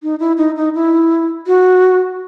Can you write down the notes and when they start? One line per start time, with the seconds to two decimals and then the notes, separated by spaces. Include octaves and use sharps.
0.03 D#4
0.20 E4
0.38 D#4
0.57 D#4
0.75 E4
1.47 F#4